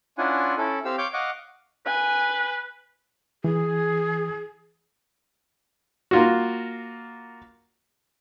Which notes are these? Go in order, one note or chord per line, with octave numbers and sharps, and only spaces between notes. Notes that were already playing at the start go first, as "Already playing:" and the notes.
C#4 D4 E4 F4 F#5 G#5
C#4 E4 A4
C4 G4 F5 E6
C#5 F5 D6 G6
D#5 F5 F#5 C#6 D6
B4 G#5
E3 G#4
A#3 F4 F#4